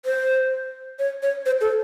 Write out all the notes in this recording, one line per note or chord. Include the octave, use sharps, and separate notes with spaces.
C5
C#5
C#5
C5
A4